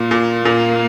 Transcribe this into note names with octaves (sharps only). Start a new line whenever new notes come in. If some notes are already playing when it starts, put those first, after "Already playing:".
Already playing: A#2 A#3
A#2
A#2 A#3